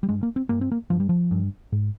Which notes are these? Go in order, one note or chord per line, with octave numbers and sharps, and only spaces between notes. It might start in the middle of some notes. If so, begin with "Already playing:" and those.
G3
G2 G#3
A#3
C4
G2 A#3
C4
A#3
G2 F3
G3
F3
G2
G#2